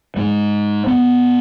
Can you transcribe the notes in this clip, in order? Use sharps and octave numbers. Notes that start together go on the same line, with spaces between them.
G#2 G#3
B3